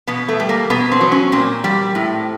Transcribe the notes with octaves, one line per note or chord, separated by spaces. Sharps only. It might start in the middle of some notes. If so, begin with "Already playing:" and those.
B2 B3
A3
G3
A#3
B2 B3
C4
F#3
C#4
A#2 C4
G3
A2